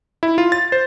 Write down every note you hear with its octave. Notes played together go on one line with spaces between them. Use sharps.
E4
F4
A6
C5